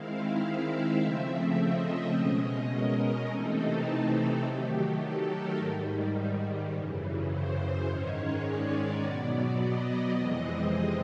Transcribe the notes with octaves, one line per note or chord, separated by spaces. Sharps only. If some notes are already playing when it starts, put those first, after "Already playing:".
Already playing: D#3 G#3 C4 E4 F5
E5
C#3 F3 A3 C4
D#5
B2 G#3 C#4
A#4
C3 E3 A3 C4 D#4 A4
D#3 F#3 A3 G4
A4
A#4
G#2 D#3 G3
F#2 C#3 E3
C5
G#2 D#3 G#3 C#4 C#5
D5
B2 F#3 B3
D#5
F2 C3 E3 G#3 C4